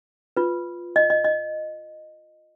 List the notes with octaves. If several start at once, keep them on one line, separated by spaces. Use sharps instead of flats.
F4 B4
D#5
D#5
D#5